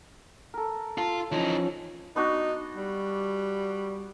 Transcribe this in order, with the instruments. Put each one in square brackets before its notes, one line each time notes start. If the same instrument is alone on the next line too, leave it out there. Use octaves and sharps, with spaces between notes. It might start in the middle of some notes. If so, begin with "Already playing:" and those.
[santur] A4 A#4
[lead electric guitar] F4 [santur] A5
[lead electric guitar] E3 D#4 [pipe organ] F3 C#4
[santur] B3 D4 F#4 [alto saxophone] D#4
[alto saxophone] G3